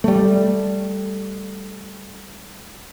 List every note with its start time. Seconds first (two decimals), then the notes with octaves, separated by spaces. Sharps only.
0.04 G3 A3